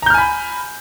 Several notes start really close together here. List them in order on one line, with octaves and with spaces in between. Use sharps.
A#5 G6 F6 G#5 B5